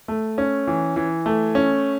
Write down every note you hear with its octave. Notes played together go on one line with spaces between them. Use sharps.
A3
C#4
E3
E3
A3
C#4